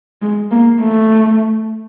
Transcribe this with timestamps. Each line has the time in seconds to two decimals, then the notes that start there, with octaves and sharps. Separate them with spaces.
0.22 G#3
0.51 A#3
0.81 A3